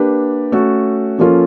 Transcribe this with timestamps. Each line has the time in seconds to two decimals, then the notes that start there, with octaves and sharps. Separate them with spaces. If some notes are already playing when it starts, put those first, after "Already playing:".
Already playing: A#3 D4 G4 B4
0.52 A3 C#4 F#4 A4
1.19 F3 A#3 C#4 F4 A4